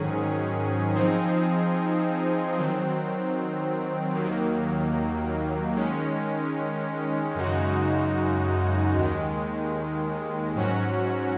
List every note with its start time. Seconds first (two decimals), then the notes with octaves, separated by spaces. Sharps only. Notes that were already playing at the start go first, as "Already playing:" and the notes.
Already playing: G#2 D#3 F#3 C#4 G#4
0.95 F3 C4 D#4 G#4
2.55 D#3 F#3 C4
4.15 D#2 D#3 F#3 A#3
5.75 D#3 G#3 C#4
7.35 F#2 C#3 G#3 D#4 F#4
8.95 D#2 D#3 G#3
10.55 G#2 F#3 C#4 F#4